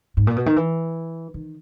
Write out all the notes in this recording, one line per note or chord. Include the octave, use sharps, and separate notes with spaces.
G#2
A#2
B2
D#3
E3
D#3